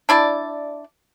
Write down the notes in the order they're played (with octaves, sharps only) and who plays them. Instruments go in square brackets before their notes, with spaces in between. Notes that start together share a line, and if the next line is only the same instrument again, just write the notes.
[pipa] D4 E4 D5 A5